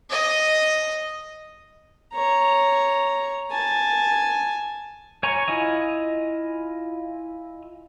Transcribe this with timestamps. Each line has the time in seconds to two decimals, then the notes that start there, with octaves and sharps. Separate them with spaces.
0.10 D#5
2.13 C#5 A#5
3.52 G#5 A5
5.23 C#5 G#5 A#5 C#6
5.48 E4 F4 D#5 G#5